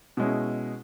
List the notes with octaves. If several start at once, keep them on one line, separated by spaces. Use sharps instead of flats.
B2 G#3 C#4 E4